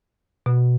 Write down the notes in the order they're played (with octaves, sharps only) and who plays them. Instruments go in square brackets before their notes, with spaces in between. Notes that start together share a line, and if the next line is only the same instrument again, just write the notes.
[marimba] B2